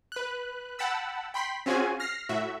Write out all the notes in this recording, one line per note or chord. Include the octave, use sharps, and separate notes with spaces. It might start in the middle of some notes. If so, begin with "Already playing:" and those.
B4 F#6
F#5 G5 A5 B5 E6
G5 B5 C6 B6
C4 C#4 F4 F#4 G#4 G#5
F6 A#6 C7
A2 F#4 E5